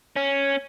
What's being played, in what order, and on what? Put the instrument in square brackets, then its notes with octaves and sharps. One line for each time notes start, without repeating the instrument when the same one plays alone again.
[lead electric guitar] C#4